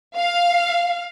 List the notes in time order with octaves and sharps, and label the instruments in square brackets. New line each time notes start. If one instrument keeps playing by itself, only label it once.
[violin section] F5